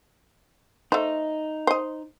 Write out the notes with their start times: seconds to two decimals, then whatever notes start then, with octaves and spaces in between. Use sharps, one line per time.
0.92 A3 D#4 C5
1.67 C5 D#5